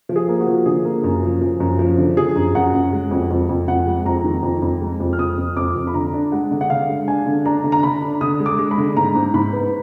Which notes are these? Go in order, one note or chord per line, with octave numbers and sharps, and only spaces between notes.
F3
G#4
A#3
F#4
F3
D3 G#4
A#3
F#2
F3
F3
F#2
F3
D3
F3 G#4
F#2
F#2 F#5
F#2
G#3
F2
F2
F2
F2 F#5
G#3
F2 A#5
D#3
F2
F2
G#3
F2
F6
F2 D#6
F2
F2 D6
F2
B5
D3 A#5
D4
G#3 F#5
D3
F#5
D3 F5
G#3
D4 G#5
D3
D4 A#5
D3
A#5
D3 B5
D4
D3 D#6
G#3
D6
G#3
B5
D3
G#2 A#5
G#2
G#2 B5
B3